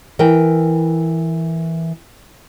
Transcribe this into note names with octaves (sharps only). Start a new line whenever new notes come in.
E3 A#4 G5